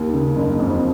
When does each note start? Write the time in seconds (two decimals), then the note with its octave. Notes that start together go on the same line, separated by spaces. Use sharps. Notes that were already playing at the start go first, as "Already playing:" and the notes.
Already playing: D#2
0.14 C#3
0.36 F#1
0.59 F2